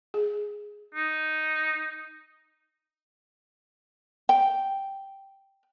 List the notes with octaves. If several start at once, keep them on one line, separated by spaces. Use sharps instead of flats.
G#4
D#4
G5